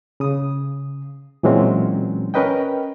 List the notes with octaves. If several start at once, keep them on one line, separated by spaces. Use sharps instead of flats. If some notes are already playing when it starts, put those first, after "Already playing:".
C#3 D#6
A#2 E3 F#3 G#3 C4 C#4
C#4 A#4 B4 D#5 G5